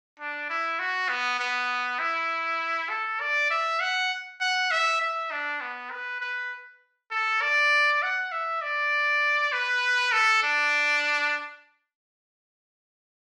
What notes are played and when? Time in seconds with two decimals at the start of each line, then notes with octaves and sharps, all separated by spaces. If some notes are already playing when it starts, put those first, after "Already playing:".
0.20 D4
0.50 E4
0.79 F#4
1.09 B3
1.39 B3
2.00 E4
2.89 A4
3.21 D5
3.51 E5
3.80 F#5
4.41 F#5
4.71 E5
5.01 E5
5.31 D4
5.61 B3
5.91 B4
6.21 B4
7.11 A4
7.42 D5
8.02 F#5
8.32 E5
8.62 D5
9.52 B4
10.12 A4
10.43 D4